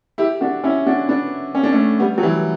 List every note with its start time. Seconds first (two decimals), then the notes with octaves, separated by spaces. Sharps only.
0.18 E4 G4
0.41 D4 F#4
0.64 C#4 E4
0.86 D4 F#4
1.09 B3 D4
1.55 C#4
1.64 D4
1.72 A3 C#4
2.00 G3 B3
2.18 F#3
2.23 E3 G3